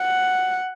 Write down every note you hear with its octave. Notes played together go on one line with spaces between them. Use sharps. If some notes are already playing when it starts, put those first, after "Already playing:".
Already playing: F#5